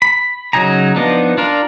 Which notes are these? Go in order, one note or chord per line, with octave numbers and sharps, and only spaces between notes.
B5
C#3 F#3 D#4 G#5 A#5
F3 B3 D4 D#4
D4 F4 A#4